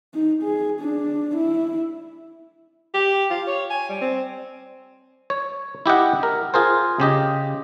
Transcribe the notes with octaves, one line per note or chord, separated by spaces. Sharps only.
D#4
G#4
D4
E4
G4
F4
C#5
G#5
G3
C4
C#5
E4 G4 D#5 F#5
A#4
F4 G#4 A#4 C5
C#3 G4 D#5